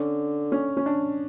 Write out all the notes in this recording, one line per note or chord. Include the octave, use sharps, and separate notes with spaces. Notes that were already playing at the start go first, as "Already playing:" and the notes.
Already playing: D3 C#4
C#4
C#4
D4